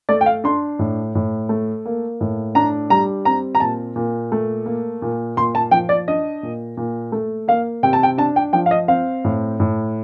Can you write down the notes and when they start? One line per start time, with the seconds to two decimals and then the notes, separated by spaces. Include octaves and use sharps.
0.09 A3 D5
0.21 G5
0.26 F5
0.44 D4 C6
0.79 A2
1.15 A2
1.49 A3
1.86 A#3
2.21 A2
2.55 D4 A#5
2.90 G3 A#5
3.25 C4 A#5
3.55 A#5
3.60 A#2 A5
3.96 A#2
4.32 A3
4.66 A#3
5.02 A#2
5.37 A#2 C6
5.55 A5
5.71 F3 G5
5.89 D5
6.08 D4 D#5
6.43 A#2
6.77 A#2
7.12 A3
7.48 A#3 F5
7.83 C3 G5
7.93 A5
8.03 G5
8.18 D4 A5
8.36 G5
8.53 F3 G5
8.66 F5
8.71 D#5
8.88 C4 F5
9.24 A2
9.60 A2